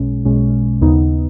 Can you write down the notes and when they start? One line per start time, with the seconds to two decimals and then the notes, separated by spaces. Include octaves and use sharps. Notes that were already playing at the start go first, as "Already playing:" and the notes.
Already playing: B1 B2 G#3 C#4
0.25 B1 B2 G#3 C#4
0.81 D#2 C#3 B3 D#4